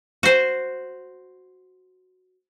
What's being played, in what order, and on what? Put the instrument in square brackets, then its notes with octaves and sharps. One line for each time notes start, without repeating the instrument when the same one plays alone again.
[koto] F#4 C5